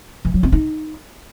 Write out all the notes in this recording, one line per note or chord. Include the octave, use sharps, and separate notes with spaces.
E3
F#3
C4
D#4